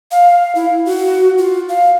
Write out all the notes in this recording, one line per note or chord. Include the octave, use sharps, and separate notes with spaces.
F5
E4
F#4
F4
F5